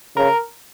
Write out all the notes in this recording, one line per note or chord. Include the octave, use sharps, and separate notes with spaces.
C#3 A#4